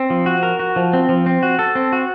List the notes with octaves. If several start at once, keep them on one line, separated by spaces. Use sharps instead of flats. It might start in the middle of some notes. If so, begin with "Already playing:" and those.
Already playing: C4
F3
F#4
A#4
F#4
F3
C4
F3
C4
F#4
A4
C4
F#4